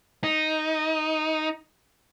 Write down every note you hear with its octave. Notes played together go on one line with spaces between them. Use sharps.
D#4